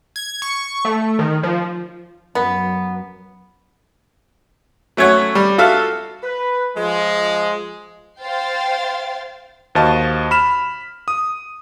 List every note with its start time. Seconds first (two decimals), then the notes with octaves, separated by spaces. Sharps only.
0.16 G#6
0.42 C#6
0.85 A3
1.19 D#3
1.43 F3
2.35 F#2 B3
4.97 F#3 A3 C#4 C#5 F#5
5.35 G3
5.58 F4 F#4 A4 E5 F5
6.23 B4
6.77 F3 G#3
8.21 C5 F5 G5 A6 C7
9.75 D#2 F#4 C5 D#5 F5 A5
10.31 B5 F6 E7
11.08 D#6